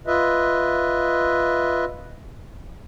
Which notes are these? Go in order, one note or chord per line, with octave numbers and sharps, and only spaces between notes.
F4 B4 D#5 E5